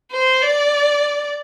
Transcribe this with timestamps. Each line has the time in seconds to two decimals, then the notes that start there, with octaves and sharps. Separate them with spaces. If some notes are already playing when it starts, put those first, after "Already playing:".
0.12 C5
0.42 D5